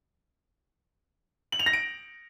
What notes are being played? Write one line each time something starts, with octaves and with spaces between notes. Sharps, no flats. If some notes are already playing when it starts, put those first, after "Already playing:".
F#7
F7
A#6
D7